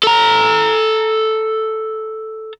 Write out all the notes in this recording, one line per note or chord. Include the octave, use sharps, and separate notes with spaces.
A4 A#5